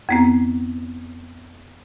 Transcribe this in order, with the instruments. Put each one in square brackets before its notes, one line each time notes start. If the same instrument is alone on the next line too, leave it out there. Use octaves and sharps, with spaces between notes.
[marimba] F2 B3 C4